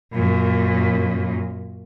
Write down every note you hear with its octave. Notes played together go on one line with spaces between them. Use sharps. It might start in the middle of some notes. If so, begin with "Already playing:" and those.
F#2 A#2